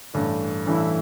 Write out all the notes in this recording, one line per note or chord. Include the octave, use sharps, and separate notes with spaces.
A1 G2 E3 A3
A1 G2 E3 A3 E4